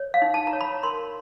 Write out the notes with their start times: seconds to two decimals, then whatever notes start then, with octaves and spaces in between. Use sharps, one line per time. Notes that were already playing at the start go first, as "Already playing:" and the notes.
Already playing: C#5
0.14 F5
0.22 D#4
0.34 A5
0.47 A#5
0.53 C#5
0.61 B5
0.83 A#4 C6